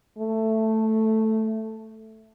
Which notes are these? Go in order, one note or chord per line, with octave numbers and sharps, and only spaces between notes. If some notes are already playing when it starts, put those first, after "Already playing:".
A3